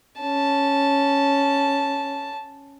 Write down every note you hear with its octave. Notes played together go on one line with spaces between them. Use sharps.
C#4 A5